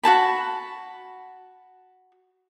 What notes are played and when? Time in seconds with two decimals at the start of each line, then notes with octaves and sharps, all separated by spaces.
0.03 F#4 G#4 A5 B5